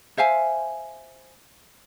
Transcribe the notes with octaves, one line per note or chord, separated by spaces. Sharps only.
C5 E5 F5 G#5